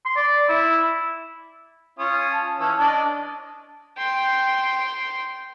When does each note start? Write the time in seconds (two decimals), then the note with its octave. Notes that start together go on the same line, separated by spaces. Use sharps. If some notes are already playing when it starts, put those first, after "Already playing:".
0.05 C6
0.16 D5
0.49 E4
1.99 C#4 F4 D#6
2.32 A5
2.60 E3 C#4 E6
2.79 D4 D#5
3.98 G5 C6